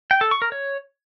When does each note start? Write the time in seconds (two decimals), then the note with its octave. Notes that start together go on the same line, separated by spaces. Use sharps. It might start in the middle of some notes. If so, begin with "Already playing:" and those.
0.11 G5
0.21 A4
0.31 C#6
0.42 A#4
0.52 C#5